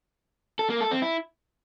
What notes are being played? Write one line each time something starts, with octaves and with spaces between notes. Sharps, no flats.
A4
A#3
A4
C4
E4